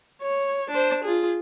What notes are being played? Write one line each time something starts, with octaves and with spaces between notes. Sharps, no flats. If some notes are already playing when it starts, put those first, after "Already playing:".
C#5
D4 C5
F4 G#4